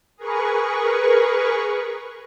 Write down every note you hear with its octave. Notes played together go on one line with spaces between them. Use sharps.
G#4 A#4 B4 C#6